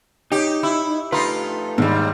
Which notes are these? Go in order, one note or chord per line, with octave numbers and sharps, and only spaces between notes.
D#4 G4 C#5 D6
E4
A3 D#4 F4 G4 B4 B5
D#2 G#2 G3